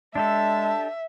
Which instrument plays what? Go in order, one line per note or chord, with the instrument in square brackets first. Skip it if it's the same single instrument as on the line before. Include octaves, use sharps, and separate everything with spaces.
[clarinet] G#3 [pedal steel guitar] D4 G4 A4 [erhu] E5 [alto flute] A5